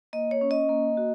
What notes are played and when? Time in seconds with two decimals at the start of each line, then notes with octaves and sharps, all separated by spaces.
0.13 A#3 D#5
0.31 C#5
0.41 C#4
0.51 D#5
0.69 A#3
0.97 F#4